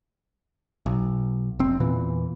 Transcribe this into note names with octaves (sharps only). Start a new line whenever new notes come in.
B1
F1 C4
E2 A#2 E3